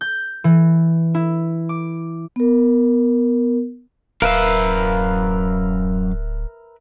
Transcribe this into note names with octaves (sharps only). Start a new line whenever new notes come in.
G6
E3
E4
D6
B3 A#4
D1 F#2 A#4 B4 E5 F5